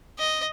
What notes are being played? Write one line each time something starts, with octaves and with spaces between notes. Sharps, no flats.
D#5